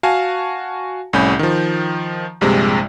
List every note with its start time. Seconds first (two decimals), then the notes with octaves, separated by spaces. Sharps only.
0.03 F#4 F5 G#5 A5
1.13 C2 A2 C#4 G#5 B5 G6
1.39 D#3 F3
2.41 A#1 G2 C3 G#3